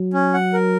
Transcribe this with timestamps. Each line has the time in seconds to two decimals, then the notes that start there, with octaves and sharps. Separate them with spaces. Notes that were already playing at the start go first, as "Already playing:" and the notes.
Already playing: F#3
0.14 C#4
0.34 F#5
0.53 A#4